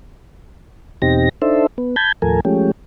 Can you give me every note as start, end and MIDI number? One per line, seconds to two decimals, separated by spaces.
1.02 1.29 40
1.02 1.29 47
1.02 1.29 60
1.02 1.29 63
1.02 1.29 67
1.02 1.29 94
1.42 1.67 62
1.42 1.67 63
1.42 1.67 69
1.42 1.67 72
1.42 1.67 76
1.78 1.96 59
1.96 2.12 81
1.96 2.12 83
1.96 2.12 91
1.96 2.12 92
2.22 2.40 39
2.22 2.40 45
2.22 2.40 53
2.22 2.40 69
2.22 2.40 70
2.22 2.40 80
2.45 2.71 53
2.45 2.71 56
2.45 2.71 57
2.45 2.71 61
2.45 2.71 67